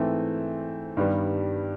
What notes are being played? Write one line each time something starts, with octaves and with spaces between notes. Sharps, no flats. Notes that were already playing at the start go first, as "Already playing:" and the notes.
Already playing: G#2 E3 A3 C4
G2 D#3 G3 B3